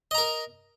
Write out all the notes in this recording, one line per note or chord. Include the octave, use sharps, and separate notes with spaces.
A#4 D#5 A#5